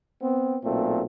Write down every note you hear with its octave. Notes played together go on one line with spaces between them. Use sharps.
B3 C4
B1 A#2 A3 C4